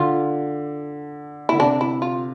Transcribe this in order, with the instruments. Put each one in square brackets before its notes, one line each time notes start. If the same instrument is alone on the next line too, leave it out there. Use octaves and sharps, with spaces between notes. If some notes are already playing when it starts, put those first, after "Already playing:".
Already playing: [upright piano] D3 [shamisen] F4
[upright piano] D3 [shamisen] E4
[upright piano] C3 [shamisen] D4
[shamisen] E4
F4